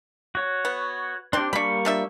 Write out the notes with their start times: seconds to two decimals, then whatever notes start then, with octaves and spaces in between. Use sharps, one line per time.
0.35 F#4 C#5
0.65 B3
1.33 C4 D4 G4 C6
1.53 G3 A#3 D4 B5 C#6
1.85 F3 D4 E5